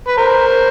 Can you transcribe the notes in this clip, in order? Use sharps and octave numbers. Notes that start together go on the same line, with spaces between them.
B4
A#4 C5